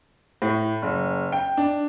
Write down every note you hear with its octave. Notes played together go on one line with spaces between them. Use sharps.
A2
F#1
G5
D4